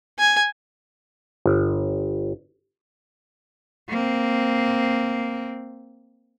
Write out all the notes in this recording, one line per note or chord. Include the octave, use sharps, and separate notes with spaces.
G#5
G1
A#3 C4